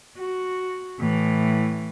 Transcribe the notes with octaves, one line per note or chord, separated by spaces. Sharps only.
F#4
A2 E3